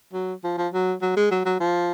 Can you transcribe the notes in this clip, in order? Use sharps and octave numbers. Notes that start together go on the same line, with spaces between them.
F#3
F3
F3
F#3
F#3
G#3
F#3
F#3
F3